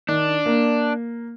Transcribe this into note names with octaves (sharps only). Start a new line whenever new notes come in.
D#3 D4
A#3